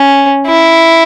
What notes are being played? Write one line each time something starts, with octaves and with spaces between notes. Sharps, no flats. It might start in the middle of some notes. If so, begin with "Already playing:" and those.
Already playing: C#4
E4